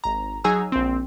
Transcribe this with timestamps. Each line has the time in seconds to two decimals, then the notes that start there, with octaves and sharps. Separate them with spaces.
0.04 G#1 A#5
0.44 F#3 D#4 G#4 G#5 A#5 E6
0.72 A#1 C4